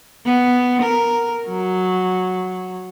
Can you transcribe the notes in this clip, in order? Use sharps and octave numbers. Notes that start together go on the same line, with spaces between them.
B3
A#4
F#3